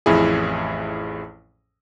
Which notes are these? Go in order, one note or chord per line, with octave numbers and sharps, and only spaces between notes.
A1 F2 E4 G#4